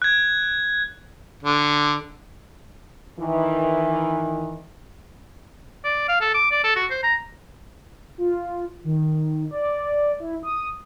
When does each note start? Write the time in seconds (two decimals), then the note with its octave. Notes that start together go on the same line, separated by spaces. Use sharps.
0.02 F#6 G#6
1.43 D3
3.19 D#3 E3
5.85 D5
6.09 F5
6.21 A4
6.35 D6
6.51 D5
6.64 A4
6.76 F#4
6.91 C5
7.04 A#5
8.18 F4
8.84 D#3
9.51 D5
10.20 E4
10.43 D#6